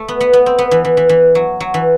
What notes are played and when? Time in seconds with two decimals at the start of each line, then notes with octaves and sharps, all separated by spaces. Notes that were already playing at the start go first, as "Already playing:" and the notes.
Already playing: A3
0.08 B3
0.21 B3
0.33 B3
0.46 C4
0.58 B3
0.71 E3
0.85 E3
0.97 E3
1.09 E3
1.35 F#3
1.60 F#3
1.74 E3